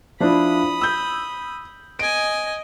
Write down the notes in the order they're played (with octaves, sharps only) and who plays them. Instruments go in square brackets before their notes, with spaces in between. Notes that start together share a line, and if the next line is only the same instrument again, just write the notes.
[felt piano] F3 D4 E4 [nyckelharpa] B5 D#6
[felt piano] E6 G6
[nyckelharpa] D#5 G#5 [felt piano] D7